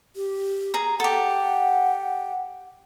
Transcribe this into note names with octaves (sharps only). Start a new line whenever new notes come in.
G4
G#4 A#5
G4 A4 F#5